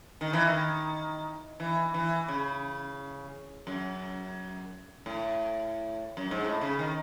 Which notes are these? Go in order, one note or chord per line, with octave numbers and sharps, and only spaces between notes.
D#3
E3
D#3
E3
E3
C#3
F#2
A2
F#2
G#2
A2
C#3
D#3